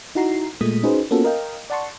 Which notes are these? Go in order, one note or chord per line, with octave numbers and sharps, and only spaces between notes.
D#4 E4 F#4 A#5 C7
A#2 G#3 A3 D#6 B6
C#4 D#4 F#4 G#4 B4 C5
A#3 B3 C#4 F4 F#4 A4
A#4 D#5 F5 G5
D5 F#5 A5 C6 C#6